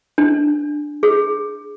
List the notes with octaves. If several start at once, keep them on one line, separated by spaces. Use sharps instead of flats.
D4
G#4